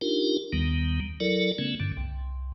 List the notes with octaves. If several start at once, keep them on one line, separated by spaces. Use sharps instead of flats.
D4 D#4 F4 G4 A#4
D#2 D#3 G3 B3
F#3 E4 A4 A#4 D5
C#3 A3 B3 C#4
G2 D3
C2